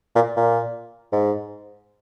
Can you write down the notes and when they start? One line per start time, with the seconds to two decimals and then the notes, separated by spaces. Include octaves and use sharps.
0.15 A#2
0.36 A#2
1.12 G#2